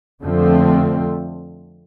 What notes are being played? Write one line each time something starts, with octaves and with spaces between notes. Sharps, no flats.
F2 D3 F3 A3 C4